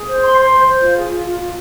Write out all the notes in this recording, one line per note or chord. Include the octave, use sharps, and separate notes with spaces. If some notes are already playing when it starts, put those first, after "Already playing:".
Already playing: G#4
C5
C6
C6
C5
C5
F4
G#4
F4
F4
F4